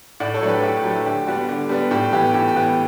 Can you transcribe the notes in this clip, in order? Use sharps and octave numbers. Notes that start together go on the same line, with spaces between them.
A2 D5 F#5
A4 C#5
F#3 A3 D4
G4 B4
A2 G4
G4
F#3 A3 D4
D3 G4
G3 B3 D4 F#4
D3
G3 B3 D4
A2 G4
E3 B3 G4
A2 G4
G4
E3 B3
G4